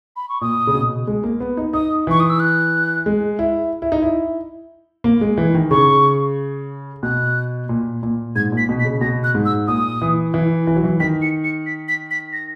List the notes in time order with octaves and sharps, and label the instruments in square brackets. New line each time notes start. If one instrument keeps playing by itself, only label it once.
[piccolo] B5
C#6
[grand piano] A#2 [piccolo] D#6
[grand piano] C#3
B2
G#3
A#3
B3
D#4
[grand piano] D#4 [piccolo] D#6
[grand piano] E3 [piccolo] C#6
[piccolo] D#6
E6
F#6
[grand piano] G#3
E4
E4
D#4
E4
A#3
G#3
E3
D#3
[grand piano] C#3 [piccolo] C#6
[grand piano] B2 [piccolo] F#6
[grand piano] A#2
A#2
[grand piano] G#2 [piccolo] G#6
[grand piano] A#2
[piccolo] B6
[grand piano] B2
[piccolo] B6
[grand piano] C#3
[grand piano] B2 [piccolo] A#6
[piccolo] F#6
[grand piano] G#2
[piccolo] E6
[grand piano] A#2 [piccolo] D#6
[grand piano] E3
E3
E3
F#3
E3
[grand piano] D#3 [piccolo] B6
[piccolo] C#7
C#7
B6
B6
B6
A#6